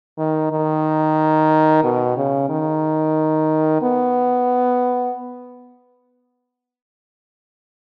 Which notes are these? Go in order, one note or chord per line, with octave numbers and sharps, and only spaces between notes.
D#3
D#3
B2
C#3
D#3
B3